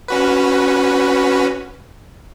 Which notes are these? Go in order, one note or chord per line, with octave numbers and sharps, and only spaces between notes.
C#4 F#4 B4